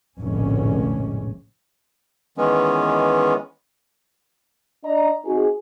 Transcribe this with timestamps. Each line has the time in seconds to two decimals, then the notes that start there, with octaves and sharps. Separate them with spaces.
0.19 F1 A#1 A2 D3 G#3 C#4
2.38 D#3 E3 G#3 B3 C#4
4.84 D4 D5 D#5 A#5
5.24 C4 D#4 F#4 G#4